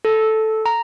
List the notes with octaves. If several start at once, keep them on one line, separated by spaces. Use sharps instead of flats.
A4
A#5